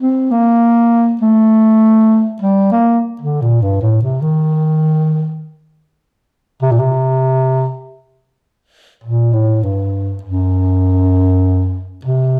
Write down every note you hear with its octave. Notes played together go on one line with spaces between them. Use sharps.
C4
A#3
A3
G3
A#3
D3
A#2
G2
A2
C3
D#3
C3
A#2
C3
A#2
A2
G2
F#2
C3